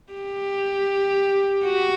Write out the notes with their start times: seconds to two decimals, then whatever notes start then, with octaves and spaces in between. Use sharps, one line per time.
0.13 G4
1.65 F#4